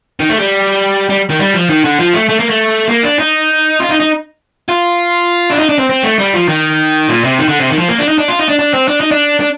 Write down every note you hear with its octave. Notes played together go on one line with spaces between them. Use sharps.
D#3
A3
G3
G3
D#3
G3
F3
D#3
D3
F3
A3
A3
A#3
A3
A#3
D4
D#4
F4
D#4
D#4
F4
D4
D#4
D4
C4
C4
A3
G3
F3
D#3
A#2
C3
D#3
D3
C3
D#3
F3
A#3
D4
D#4
D4
F4
D#4
D4
D4
C4
D4
D#4
D4
D4